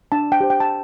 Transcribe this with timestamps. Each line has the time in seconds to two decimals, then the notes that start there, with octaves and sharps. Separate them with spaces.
0.12 D4 A5
0.32 G5
0.41 G4 C5
0.50 G5
0.60 A5